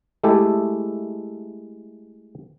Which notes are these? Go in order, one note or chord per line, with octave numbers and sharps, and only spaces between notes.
G#3 A3 E4 G4 A4